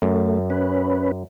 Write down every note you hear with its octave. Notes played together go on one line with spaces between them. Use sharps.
F#2 A3
C#4 B4